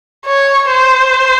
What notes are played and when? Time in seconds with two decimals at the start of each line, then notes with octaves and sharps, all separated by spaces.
0.26 C#5
0.70 C5